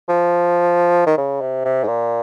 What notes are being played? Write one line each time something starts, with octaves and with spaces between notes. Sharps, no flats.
F3
D#3
C#3
C3
C3
G#2
A#2